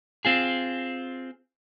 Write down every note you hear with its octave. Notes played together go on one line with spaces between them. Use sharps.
C4 F4 G#4